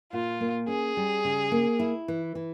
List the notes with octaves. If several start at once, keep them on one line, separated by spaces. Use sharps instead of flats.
A#2 F4
A#3
C#4 G#4
G3
C#3
A#3
E4
E3
E3